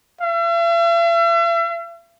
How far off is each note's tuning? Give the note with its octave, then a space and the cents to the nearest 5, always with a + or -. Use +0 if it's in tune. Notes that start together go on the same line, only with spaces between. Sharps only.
E5 +45